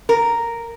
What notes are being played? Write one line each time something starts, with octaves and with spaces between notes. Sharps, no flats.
A#4